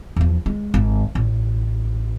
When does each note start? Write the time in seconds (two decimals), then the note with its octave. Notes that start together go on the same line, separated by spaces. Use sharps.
0.16 E2 F3
0.46 G#3
0.74 G#1
1.15 A1